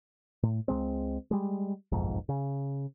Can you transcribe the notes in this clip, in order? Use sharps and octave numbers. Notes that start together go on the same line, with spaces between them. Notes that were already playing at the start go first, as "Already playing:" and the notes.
A2
C#2 G2 G#3 C4
G3 G#3
F#1 B1 F2 G#2
C#3